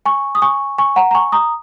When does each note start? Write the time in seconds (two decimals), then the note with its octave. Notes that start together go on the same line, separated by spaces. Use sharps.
0.06 G#5 C#6
0.35 D#6
0.42 G#5 C#6
0.78 G#5 C#6
0.96 F#5 A#5
1.11 A#5
1.15 G#5 C#6
1.32 A#5 D#6